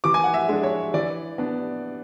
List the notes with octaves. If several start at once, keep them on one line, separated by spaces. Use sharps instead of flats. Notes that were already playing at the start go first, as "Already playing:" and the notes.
E3 D6
G#5
F#5
E5
G#3 D4
C#5
E3 D5
B3 D4